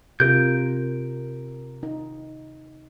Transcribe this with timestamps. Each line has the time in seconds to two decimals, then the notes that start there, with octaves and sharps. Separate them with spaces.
0.20 C3 F4 A#4 G6
1.83 D#4